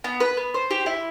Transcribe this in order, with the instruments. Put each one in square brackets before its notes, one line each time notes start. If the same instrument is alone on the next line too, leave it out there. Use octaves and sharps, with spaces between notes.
[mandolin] B3
B4
B3
C5
G4
E4